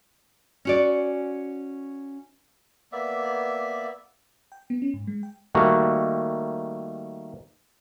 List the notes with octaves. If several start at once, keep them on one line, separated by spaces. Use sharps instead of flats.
C#4 F#4 D5
A#3 B3 D5 E5
G5
B3
C#4
G#2
G#3
G5
D#3 G3 A3 A#3 F#4